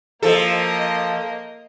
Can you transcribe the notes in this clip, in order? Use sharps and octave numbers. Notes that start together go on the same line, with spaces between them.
F3 A#3 A4 D#5